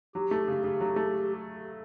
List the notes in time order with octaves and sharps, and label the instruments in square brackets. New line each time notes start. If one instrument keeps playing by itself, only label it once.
[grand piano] F#3 [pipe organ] G4
[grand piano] A3
C#3
C#3
F#3
A3